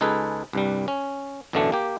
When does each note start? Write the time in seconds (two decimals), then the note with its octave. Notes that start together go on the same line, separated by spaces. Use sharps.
0.01 C#2 D#4 G#4 A4 B4
0.53 C2 G2 G3
0.88 C#4
1.53 A1 F#2 B2 D3 A3 D4
1.72 A#3 G4